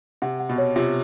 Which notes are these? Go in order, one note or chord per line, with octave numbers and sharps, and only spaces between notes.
C3 F#5
F#5
B2
C#5
C3 F4